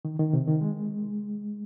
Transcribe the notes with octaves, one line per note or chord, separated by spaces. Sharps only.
D#3
D#3
C3
D#3
G#3